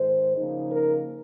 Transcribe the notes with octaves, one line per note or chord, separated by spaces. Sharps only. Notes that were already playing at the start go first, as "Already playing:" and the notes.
Already playing: G#2 D#3 G#3 C5
C#3 F3 A#3 D#4
A#4